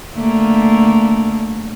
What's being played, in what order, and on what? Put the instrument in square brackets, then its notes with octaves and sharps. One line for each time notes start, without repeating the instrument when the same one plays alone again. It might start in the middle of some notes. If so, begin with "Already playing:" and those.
[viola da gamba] D3 A3 A#3